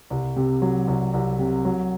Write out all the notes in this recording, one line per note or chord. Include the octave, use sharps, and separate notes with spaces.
C2
C3
F#3
C2
C2
C3
F#3